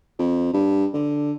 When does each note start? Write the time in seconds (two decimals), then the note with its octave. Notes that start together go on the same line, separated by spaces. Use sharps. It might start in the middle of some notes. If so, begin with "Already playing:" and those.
0.19 F2
0.53 G2
0.94 D3